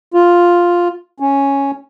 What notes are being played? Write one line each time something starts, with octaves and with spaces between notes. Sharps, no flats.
F4
C#4